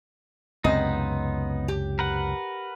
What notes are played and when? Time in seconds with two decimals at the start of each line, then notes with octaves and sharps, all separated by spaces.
0.64 C#2 F#2 C3 B3 C4 D#4 D#5
1.68 G4
1.99 A#4 B4 F#5